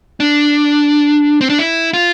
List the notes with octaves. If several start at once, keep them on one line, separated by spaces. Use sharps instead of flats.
D4
C4
D4
E4
F4